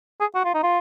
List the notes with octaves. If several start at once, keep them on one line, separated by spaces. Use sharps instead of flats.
G#4
F#4
F4
D#4
F4